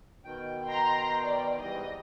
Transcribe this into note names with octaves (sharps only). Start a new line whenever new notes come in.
B2 D#3 G5
A#5 C6
D5
G#2 E3 G3 D#5